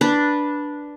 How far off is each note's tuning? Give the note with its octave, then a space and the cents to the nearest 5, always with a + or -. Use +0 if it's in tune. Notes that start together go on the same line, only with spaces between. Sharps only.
D4 +0 B4 -10